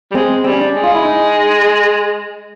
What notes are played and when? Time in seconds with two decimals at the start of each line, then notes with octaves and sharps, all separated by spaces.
0.11 G3
0.15 G#3 C4
0.44 G3 C4
0.52 C#4
0.61 D4
0.75 G#3
0.84 F4
0.95 E4
1.05 D#4